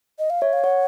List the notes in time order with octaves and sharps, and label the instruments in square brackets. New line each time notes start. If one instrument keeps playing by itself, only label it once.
[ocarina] D#5
F5
[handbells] C#5 [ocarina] E5
[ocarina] F5
[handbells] C#5 [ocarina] F#5